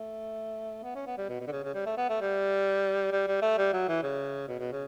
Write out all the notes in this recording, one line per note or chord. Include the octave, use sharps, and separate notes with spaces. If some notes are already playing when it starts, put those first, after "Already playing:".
Already playing: A3
B3
C#4
B3
G3
B2
B2
D3
C#3
C#3
G3
A3
B3
A3
G3
G3
G3
A3
G3
F#3
E3
C#3
B2
B2
C#3